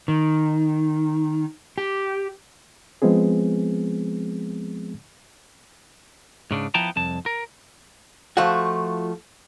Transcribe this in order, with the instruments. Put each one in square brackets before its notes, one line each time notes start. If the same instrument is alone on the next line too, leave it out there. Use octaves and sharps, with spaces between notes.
[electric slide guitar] D#3
G4
[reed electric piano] F3 G#3 B3 C4 G#4
[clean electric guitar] G#2 C#3 D4
F3 B3 E4 G5 A5 A#5
C2 F2 A5
A#4
[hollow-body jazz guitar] F3 A3 F4 F#4